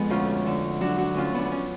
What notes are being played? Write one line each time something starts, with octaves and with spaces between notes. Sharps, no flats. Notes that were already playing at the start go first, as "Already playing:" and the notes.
Already playing: F2 G#3 B3
D2 C#4 F4
D3
F#3 D4 F#4
D4 F#4
D2 C#4 F4
B3 D4
B3
C#4